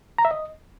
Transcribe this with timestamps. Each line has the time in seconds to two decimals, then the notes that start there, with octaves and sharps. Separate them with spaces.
0.18 A#5
0.25 E5
0.31 D#5